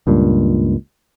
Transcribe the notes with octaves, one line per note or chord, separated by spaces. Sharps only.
C#2 G2 A#2